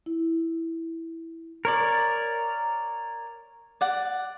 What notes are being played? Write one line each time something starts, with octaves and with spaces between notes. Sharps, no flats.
E4
A#4 C#5 D5
D5 F#5